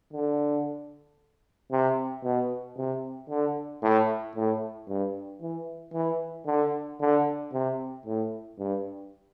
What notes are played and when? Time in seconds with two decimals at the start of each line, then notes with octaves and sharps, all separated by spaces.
0.13 D3
1.72 C3
2.24 B2
2.77 C3
3.30 D3
3.83 A2
4.36 A2
4.89 G2
5.41 E3
5.94 E3
6.46 D3
7.00 D3
7.53 C3
8.06 A2
8.59 G2